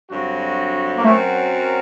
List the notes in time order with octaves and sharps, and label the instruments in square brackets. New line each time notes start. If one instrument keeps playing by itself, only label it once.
[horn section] G2 D3 F#3 C4 F#4
[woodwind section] A#3
[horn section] F#2 F#3 C4 F#4 A#4 [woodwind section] A3